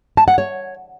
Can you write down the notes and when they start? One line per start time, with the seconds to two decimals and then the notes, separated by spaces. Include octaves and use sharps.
0.17 A5
0.28 F#5
0.38 C#5